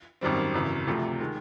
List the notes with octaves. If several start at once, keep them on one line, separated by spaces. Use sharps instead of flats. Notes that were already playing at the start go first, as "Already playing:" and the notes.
G#1 F#2 D#3 G3 C4
G#1 F#2 C#3 E3
D2 C3 F3 A3
D#3 G#3